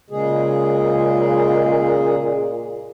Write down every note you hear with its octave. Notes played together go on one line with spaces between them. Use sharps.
A#2 C#3 G#3 G#4